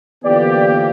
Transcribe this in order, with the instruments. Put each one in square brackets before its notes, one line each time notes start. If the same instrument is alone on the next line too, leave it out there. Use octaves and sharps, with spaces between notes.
[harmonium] D3 F3 A#3 [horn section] E3 G4 [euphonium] B3 [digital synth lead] D5